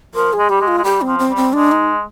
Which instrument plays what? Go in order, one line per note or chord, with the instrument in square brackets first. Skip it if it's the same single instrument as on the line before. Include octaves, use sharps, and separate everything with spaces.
[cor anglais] F3 [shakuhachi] A#4
[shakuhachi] G#4
[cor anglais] G#3
[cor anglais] G3 [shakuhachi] G4
[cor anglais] G#3
[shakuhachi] F4
[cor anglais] G#3
[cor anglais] G3 [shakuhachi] G4
[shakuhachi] C4
[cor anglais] F3
[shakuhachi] C4
[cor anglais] G3
[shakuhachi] C4
[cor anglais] G#3 [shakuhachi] D4
[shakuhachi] D#4